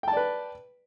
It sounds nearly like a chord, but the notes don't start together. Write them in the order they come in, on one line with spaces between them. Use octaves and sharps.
G5 A5 D5 B4